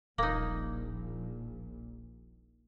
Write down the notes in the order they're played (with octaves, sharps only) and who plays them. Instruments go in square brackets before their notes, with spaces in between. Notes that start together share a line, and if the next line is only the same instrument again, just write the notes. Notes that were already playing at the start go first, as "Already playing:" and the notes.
[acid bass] D#1 [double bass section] A#1 A#2 [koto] A#3 D#4